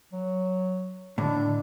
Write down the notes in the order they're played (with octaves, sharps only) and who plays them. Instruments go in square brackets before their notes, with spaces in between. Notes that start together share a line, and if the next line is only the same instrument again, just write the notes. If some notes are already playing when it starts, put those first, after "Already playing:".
[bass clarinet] F#3
[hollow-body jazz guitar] A2 [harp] D3 D#3 [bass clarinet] D4